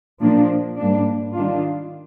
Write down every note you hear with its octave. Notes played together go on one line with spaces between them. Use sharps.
A#2 F3 A#3 D4
G#2 G3 A#3 D4
D#3 G3 D4 F4